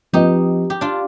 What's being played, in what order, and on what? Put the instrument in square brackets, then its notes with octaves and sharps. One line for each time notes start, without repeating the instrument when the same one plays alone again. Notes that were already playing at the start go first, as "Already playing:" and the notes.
[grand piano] F3 C4 F4 B4 D#5 [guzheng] D#4 G4
[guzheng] G4
D4 F4